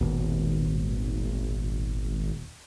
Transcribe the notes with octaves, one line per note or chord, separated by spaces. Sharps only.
D#1 G#1 D#2 B2